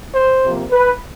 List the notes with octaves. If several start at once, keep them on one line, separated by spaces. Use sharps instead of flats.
C5
C3 F3 A#3
B4